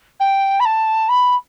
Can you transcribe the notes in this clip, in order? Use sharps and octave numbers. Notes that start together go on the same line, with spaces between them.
G5
B5
A5
B5